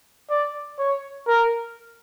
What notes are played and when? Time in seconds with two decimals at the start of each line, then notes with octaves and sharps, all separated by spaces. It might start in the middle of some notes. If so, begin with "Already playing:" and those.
0.30 D5
0.79 C#5
1.28 A#4